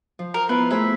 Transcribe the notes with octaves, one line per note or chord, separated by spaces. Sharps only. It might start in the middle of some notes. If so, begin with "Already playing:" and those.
F3
A#4
B3 E4 F4 B4
A3 G#4 C5 E5